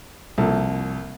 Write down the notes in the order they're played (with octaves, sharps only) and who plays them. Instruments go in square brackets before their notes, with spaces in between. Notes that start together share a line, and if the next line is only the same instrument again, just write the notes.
[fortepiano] C2 F3 A#3 A4